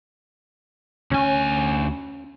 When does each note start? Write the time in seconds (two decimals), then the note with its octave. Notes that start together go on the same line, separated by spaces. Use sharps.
1.11 D2 C#4 G#5